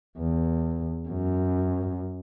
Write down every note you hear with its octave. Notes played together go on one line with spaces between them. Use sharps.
E2
F#2